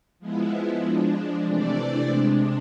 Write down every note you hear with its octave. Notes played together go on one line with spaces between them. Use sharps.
F3 G#3 B3 E4
F3 G#3 D4
C3 E3 A3 D4 D5
C3 G#3 D4 C5